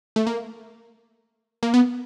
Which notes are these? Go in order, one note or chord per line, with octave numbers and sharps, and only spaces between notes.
A3
A#3
A#3
B3